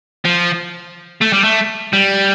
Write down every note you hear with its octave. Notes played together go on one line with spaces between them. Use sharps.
F3
A3
G3
A3
G3